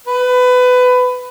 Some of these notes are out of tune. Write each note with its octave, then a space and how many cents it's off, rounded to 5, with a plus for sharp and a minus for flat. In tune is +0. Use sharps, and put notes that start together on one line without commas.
B4 +20